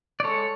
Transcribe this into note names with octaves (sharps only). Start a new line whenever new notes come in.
D5
G#3 A4 C#5